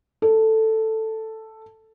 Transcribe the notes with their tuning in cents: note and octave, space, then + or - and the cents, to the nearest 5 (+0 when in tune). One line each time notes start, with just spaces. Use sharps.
A4 +5